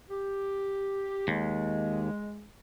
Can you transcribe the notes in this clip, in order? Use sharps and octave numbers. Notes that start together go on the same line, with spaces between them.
G4
D#2 G#3